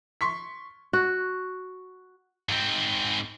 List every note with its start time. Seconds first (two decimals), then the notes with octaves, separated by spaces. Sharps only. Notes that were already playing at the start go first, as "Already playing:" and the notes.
0.21 C6 C#6 B6
0.93 F#4
2.49 G#2 C4